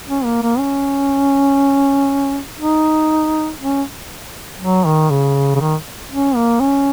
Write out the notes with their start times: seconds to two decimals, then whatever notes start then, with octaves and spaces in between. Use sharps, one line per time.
0.08 C#4
0.25 A#3
0.42 A#3
0.59 C#4
2.59 D#4
3.60 C#4
4.61 F#3
4.86 D#3
5.10 C#3
5.55 C#3
5.60 D#3
6.11 C#4
6.36 A#3
6.61 C#4